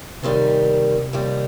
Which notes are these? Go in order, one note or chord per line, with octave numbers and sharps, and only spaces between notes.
D#2 C3 D#3 G3
D#2 D#3 G3